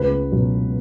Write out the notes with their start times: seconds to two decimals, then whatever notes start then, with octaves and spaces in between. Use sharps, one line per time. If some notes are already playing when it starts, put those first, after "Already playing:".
Already playing: C#2 B4
0.32 B2 F#3